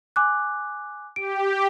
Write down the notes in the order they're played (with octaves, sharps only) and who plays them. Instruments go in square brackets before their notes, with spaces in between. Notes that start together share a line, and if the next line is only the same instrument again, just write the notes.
[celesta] G#5 D6 F#6
[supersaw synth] G4 [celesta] D7